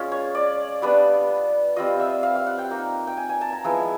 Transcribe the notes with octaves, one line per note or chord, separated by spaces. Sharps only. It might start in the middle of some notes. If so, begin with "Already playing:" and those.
Already playing: G#3 C#4 F4
C#5
D5
G3 B3 D4
G3 C4 F4 D#5
E5
F5
F5
F#5
G5
A#3 D#4
G5
G#5
G#5
A5
A#5
F3 G#3 B3 E4 G#5